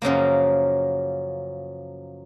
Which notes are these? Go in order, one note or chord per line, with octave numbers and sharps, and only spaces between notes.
F#2 C#3 F3 A#3